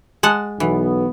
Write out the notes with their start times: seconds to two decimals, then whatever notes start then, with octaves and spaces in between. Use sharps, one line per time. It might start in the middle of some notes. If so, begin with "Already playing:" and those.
0.23 G#3 F#5 A5
0.60 B1 E3 B3